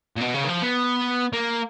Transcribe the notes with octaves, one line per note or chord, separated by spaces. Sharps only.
A#2
B2
C#3
D#3
F3
B3
A#3